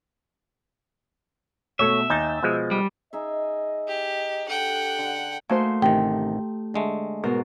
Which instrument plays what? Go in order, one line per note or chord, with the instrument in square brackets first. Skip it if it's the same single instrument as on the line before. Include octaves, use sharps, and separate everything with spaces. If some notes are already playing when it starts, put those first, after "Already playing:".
[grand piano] B2 A3 [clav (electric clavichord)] A4 C#5 [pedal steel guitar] E5
[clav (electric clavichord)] D#2 D#4 [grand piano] G#5 G6 A6
[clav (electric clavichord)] B2 F3 G#3
[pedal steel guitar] G3
[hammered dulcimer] D#4 G#4 E5 [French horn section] D#5
[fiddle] G4
[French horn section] D4 G4 A4 [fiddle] F#5 G5
[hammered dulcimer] D3
[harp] A3 D#4 C6 [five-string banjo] A#3 F#4 C5 [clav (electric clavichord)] G#5
[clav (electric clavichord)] A1 C3 D#3 [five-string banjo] G4
[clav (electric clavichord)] D3 G#3 A3
[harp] G#2 B2 [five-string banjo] A#4